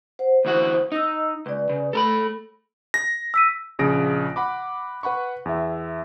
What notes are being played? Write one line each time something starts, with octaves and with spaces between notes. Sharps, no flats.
C5 F#5
D2 E3 F#4 C5 D#6
D#4 D#5 E6
C#2 B4 D5
C#3
A3 A4 A#5 B5
A#6
E6 B6 D#7
A#1 C#3 D#6 A#6 D7
F#5 B5 D6
B4 F#5 B5 C#6
E2 E5